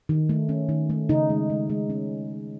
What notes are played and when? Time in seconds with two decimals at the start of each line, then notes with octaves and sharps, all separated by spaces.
0.09 D#3
0.29 A3
0.49 C#4
0.69 D#3
0.90 A3
1.09 C#3 D#4
1.30 G#3
1.50 G#3
1.70 G#3
1.90 C#4